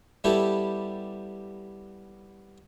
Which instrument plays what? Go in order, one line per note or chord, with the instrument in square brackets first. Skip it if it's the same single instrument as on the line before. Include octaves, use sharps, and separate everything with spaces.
[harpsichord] G3 B3 E4 G4 A4